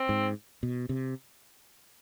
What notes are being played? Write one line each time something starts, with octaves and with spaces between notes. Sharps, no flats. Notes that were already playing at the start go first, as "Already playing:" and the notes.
Already playing: C4
G#2
B2
C3